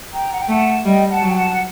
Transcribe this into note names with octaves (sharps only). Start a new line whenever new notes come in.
G5 A#5
F#5
G5
A3 F#5 A5
G3 D#5 G5
F#5 A5
F#3
G5
F#5 A5
F#5